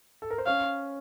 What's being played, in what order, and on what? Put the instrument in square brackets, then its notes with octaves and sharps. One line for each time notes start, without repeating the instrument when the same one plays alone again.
[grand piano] A4
A#4
C5
[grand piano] C#4 C#5 [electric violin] F5